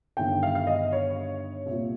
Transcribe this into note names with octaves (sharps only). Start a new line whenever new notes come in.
G1 G2 D#3 G5
F5
F5
D#5
C#5
C2
A#2